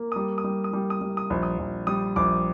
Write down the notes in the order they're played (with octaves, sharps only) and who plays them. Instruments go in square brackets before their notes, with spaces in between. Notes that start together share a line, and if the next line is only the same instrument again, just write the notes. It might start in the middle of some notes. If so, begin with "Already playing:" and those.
Already playing: [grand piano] A#3
G3 D#6
D#6
G3
D#6
G3
D#6
G3
D#6
A#1
D#6
A#1
G3 D#6
A#1 D6